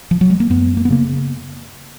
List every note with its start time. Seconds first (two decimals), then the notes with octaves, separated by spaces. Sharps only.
0.11 F3
0.21 F#3
0.30 G#3
0.40 A#3
0.50 F#2 B3
0.77 A#3
0.85 B3
0.90 C#3 A#3